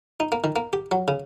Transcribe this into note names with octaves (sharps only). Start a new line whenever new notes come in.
D#4
A#3
D#3
A#3
G4
F#3
C#3